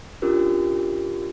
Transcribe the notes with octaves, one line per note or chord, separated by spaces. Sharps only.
C#4 D4 F4 G4 A#4